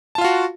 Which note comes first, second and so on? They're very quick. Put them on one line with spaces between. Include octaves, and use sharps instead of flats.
A5 F4 F5 F#4